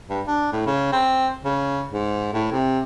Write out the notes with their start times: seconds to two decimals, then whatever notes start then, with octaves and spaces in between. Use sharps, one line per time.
0.09 G2
0.27 D4
0.52 A2
0.66 C#3
0.92 C4
1.45 C#3
1.93 G#2
2.33 A2
2.52 C3